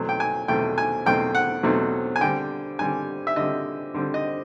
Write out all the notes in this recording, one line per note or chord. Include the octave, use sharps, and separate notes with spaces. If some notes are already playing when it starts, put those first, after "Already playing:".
Already playing: E2 B2 F#3 A3 C4
G5
G#5
E2 B2 F#3 A3 C4 G5
G#5
E2 B2 F#3 A3 C4 G5
F#5
E2 B2 F#3 A3 C4
G#5
D3 G3 C4 G5
D3 G3 C4 G#5
E5
D3 G3 C4 D#5
D3 G3 C4
D#5